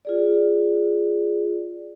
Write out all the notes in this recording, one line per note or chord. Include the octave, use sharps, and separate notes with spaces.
F4 G#4 D5